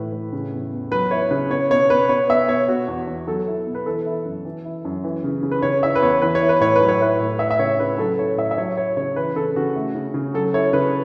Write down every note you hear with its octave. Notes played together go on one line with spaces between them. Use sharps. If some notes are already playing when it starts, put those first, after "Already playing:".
Already playing: A2 E3 B4
A2
C#3
E2
E2
F#3 B4
E4 C#5
C#3 B4
B3 C#5
B2 C#5
B2 B4
B3 C#5
B2 E5
B2 C#5
B2 F#4
E2
E2
F#3 A4
E4
B2
B4
E3 A4
E4
F#2
E3
E4
F#2
E3
C#3
C#3
B4
C#3 C#5
E4 E5
B4
E2 C#5
E3 B4
C#5
E4
B4
A2 C#5
B4
F#3
C#5
E4 B4
A2
A3 E5
E5
C#3 C#5
C#3 B4
F#3 A4
E4 C#5
A2 E5
E5
F#3 C#5
E4 C#5
C#3 C#5
E3 B4
C#3 A4
C#3 F#4
A3
C#3
C#3
F#3 A4
E4 C#5
C#3 B4